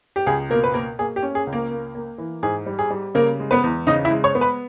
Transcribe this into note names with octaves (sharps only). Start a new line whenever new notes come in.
G4
C#2 G#4
B2 A#3 A#4
B4
A#3 A#4
A#3 G#4
G4
C#4
G#4
C#2
A#3 A#4
A#3
A#3
E3
G#2 G#4
G3
G#4
G3
C#3 A#3 A#4
G#3
B3 B4
E2
C#3 D#4 D#5
E4 E5
G#3
C#5 C#6
B3
B4 B5